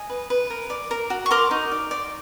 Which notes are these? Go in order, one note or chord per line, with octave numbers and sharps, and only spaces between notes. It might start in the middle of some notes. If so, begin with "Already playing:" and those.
Already playing: D#5 G#5
B4
B4
A#4
D5
A#4
F#4
C#6
A#4 C6 D6
D#4
D5
D5